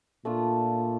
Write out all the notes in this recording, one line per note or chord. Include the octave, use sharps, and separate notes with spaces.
A#2 A3 D4 F4